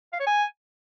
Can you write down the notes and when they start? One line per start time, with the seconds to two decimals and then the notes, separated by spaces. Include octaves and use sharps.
0.13 F5
0.20 C#5
0.27 G#5